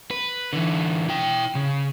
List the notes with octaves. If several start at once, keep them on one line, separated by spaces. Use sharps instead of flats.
B4
D3 E3
E4 G5
C#3